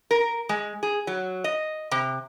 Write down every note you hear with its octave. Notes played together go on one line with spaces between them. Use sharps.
A#4
G#3
G#4
F#3
D#5
C3